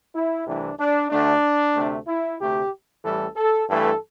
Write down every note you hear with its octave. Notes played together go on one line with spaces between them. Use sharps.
E4
C2 C3 E3 A3 D4
D4
D2 D3 A3 D4
D2 C3 A3
E4
D2 C3 A3 G4
A1 A2 E3 G3 A4
A4
G2 E3 A3 A4